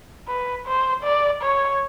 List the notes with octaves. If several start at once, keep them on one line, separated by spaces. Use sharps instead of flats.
B4
C5
D5
C#5